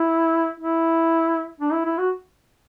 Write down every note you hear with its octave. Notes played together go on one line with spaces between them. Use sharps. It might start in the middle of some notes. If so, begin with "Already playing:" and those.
Already playing: E4
E4
D4
E4
E4
F#4